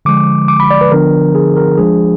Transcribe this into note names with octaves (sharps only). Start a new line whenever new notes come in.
D3 F3 G#3 D6
D6
B5
D5
B4
D3 F3 B3 D4 A#4
G#4
A#4
F3 G#3 D4 G#4